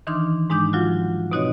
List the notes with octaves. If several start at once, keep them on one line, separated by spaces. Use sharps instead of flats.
D#3 E3 D4 D#4 C6 F6
G#2 G#3 D4 D#4 D6 G6
F3 F#3 F4 F#4
B2 C4 D#4 F#4 C#5 D#5